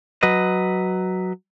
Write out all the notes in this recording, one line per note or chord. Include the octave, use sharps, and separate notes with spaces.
F#3 B4 D#5